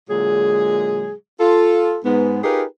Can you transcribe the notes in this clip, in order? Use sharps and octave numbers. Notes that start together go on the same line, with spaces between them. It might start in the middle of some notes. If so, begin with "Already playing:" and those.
A#2 D3 F#3 G#3 G#4
F4 A4
G#2 B3
D#4 F4 G4 G#4 A#4 B4